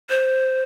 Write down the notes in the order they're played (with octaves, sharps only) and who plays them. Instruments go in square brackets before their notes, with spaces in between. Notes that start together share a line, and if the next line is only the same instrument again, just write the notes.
[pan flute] C5